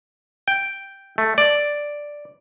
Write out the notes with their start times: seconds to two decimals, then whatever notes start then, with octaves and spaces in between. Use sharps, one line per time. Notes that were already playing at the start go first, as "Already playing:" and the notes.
0.48 G5
1.18 A3
1.38 D5